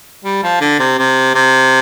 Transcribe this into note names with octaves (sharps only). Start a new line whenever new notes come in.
G3
F3
D3
C3
C3
C3